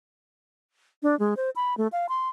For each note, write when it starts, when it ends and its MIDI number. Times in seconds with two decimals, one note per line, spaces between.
1.03 1.17 62
1.19 1.34 56
1.37 1.50 72
1.56 1.76 83
1.78 1.88 57
1.92 2.07 77
2.09 2.29 84